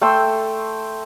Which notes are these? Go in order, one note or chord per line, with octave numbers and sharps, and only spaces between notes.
A3 G5 C6 E6